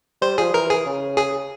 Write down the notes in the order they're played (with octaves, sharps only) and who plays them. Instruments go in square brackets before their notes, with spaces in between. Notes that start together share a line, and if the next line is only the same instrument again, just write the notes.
[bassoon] G3 [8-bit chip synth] C5
[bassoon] F3 [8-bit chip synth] G#4
[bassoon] E3 [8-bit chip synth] A#4
[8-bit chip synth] G#4
[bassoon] C#3
[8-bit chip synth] G#4